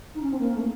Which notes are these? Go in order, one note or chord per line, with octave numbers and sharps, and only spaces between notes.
D#4
C#4
C4
A#3
A3